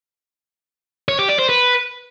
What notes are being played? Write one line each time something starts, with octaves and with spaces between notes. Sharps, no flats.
C#5
G4
D5
C5
B4